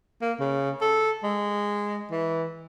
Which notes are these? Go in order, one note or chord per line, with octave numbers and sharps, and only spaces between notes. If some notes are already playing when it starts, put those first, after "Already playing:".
A#3
C#3
A4
G#3
E3